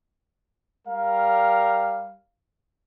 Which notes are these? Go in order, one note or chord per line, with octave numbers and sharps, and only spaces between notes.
G3 A#4 F5